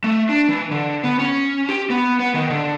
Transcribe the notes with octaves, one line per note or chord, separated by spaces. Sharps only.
A3
D4
E3
D3
B3
C#4
G4
B3
B3
D#3
D3